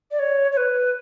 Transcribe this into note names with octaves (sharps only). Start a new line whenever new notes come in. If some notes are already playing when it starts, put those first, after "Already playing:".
D5
C#5
C#5
B4